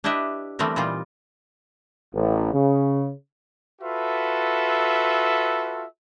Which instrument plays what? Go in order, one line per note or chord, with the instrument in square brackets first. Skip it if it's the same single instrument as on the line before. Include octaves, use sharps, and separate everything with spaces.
[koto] D4 E4 G4 B4 D#5 E5
E3 G3 A3 B3 C4 A#4
A#2 E3 G3 D#4 F4
[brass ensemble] A1
C#3
[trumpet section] F4 F#4 A4 B4 E5